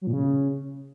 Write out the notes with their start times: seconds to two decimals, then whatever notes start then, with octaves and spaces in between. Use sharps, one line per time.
0.01 F#3
0.07 A#2
0.13 C#3